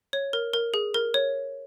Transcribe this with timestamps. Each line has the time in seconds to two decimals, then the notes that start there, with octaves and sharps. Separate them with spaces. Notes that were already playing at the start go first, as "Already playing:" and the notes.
0.13 C#5
0.33 A#4
0.54 A#4
0.74 G#4
0.94 A#4
1.14 C#5